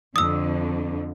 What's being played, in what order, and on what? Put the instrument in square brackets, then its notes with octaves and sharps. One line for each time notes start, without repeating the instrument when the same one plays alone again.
[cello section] F2 D3 [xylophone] D#6 E6